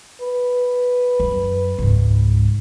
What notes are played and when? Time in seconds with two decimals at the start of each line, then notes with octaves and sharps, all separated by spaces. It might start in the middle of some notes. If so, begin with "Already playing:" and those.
0.21 B4
1.20 F#2
1.78 C#2 G#2